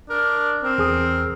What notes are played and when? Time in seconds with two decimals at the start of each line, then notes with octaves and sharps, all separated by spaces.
0.10 D4 A#4
0.63 C4 A#4
0.78 E2 G#4 D#6